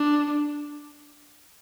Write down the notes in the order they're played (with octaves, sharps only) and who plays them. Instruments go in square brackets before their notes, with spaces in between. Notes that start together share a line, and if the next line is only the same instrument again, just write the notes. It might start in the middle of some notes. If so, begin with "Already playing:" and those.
Already playing: [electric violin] D4